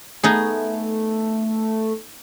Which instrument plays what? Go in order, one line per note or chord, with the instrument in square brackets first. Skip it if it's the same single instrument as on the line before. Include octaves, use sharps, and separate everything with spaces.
[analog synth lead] A3 [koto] B3 D#4 G#4